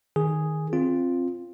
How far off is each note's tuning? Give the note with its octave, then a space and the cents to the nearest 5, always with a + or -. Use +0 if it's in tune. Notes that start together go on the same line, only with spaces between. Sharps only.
D#3 +0 G#4 +0
C4 +15 F4 +0